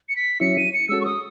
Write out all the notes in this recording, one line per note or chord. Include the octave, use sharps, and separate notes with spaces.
C#7
B6
F#3 C#4 E4 C#7
D#7
C#7
G#3 C#4 F#4 A4 E6
C#6
D#6